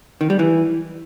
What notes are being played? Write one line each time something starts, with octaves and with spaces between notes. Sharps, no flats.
D#3
G3
E3